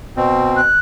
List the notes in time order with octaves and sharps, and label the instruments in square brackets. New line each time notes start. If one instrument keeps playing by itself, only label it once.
[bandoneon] B2 C4
[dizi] F#6